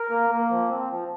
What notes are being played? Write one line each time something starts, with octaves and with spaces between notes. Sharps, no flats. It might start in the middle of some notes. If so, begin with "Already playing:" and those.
Already playing: A#4
A#3
A#3
F3
C4
F3